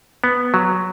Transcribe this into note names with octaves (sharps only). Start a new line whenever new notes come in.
B3
F#3